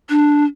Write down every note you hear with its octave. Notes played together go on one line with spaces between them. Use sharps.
D4